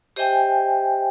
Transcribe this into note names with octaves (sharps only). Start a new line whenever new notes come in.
G4 C5 D#5 E5 G5 G#5